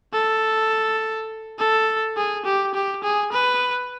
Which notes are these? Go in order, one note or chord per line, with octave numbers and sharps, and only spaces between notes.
A4
A4
G#4
G4
G4
G#4
B4